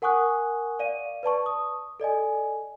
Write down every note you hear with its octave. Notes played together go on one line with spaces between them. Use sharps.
A#4 F#5 G#5 C#6 D#6 F#6
D5 F5 D#7
B4 D5 A5 C#6
D#6
A4 D5 D#5 G#5